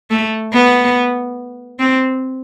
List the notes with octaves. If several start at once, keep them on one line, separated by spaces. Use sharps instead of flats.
A3
B3
C4